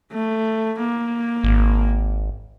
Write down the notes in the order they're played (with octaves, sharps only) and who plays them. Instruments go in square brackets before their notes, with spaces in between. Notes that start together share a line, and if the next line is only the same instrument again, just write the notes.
[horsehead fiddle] A3
A#3
[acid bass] G#1